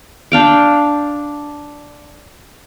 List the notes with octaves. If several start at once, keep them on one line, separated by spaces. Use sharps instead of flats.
D4 F5 G5